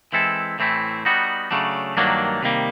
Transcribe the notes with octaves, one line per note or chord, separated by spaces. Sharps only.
E3 G#3 C4 E4 A4
A2 E3 A3 C4 E4
G3 B3 D#4 F#4
C#3 F#3 A3 D4
G2 D#3 F#3 A#3 D4
C3 D#3 G3 A#3